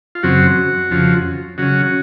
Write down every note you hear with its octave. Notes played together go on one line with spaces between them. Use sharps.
F4
F#2 C#3 F#3 C4 F#4
F2 C#3 F3
C#3 F#3 C#4 F#4